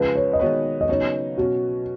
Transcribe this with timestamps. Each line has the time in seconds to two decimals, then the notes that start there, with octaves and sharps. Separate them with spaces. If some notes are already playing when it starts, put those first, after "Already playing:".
Already playing: C#2 C#3 F3 G#3 B4
0.16 C#5
0.33 D#5
0.39 D#3 G#3 B3 F#4 B4 C#5
0.81 D#5
0.89 C#3 F#3 B3 D#4 C#5
1.38 B2 F#3 C#4 F#4